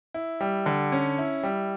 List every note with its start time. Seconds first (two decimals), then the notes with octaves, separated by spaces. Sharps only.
0.14 E4
0.41 G3
0.66 D3
0.92 C#4
1.18 E4
1.43 G3